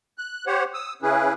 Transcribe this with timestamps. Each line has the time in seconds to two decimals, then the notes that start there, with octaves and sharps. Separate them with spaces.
0.18 F#6
0.47 G4 C5 C#5 F#5
0.74 D#6 E6
1.02 C#3 C#4 E4 G#4 B4